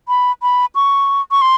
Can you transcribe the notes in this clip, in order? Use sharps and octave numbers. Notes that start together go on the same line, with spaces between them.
B5
B5
C#6
C#6
C6